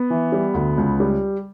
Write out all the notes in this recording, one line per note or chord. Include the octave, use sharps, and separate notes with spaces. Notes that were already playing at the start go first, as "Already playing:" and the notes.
Already playing: B3
E3
G3
D2
C#2
G3